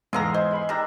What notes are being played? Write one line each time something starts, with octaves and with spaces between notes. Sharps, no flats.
E2 G#2 D3 G#4 E5 F5 A#5 C6
C5 D#5 G#5
G#3 B5 C6
D#3 D4 G4 E5 A#5